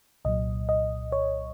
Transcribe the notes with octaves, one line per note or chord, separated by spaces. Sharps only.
C2 A#2 F#3 D#5
D#5
C#5